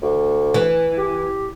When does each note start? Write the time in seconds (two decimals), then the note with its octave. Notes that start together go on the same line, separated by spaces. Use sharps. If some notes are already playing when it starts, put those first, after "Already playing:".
0.02 D2
0.54 E3
0.98 G4